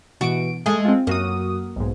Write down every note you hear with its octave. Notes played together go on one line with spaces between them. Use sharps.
B2 E3 F#4 D7
G#3 A3 G#4 G#5 G#6
C4 F4
F#2 A#3 F#4 D#6
B1 G#2